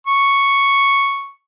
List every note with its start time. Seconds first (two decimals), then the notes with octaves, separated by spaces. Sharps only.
0.07 C#6